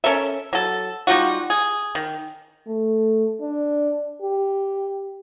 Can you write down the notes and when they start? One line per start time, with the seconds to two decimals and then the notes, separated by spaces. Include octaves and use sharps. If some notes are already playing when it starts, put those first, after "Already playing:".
0.04 C#4 A4 A#4 E5
0.53 F#3 A4
1.07 G3 D#4 F4 F#4
1.50 G#4
1.95 D#3
2.67 A3
3.41 D4
4.22 G4